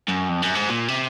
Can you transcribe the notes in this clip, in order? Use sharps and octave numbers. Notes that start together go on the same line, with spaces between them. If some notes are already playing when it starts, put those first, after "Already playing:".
F#2
F2
F#2
G#2
A#2
C3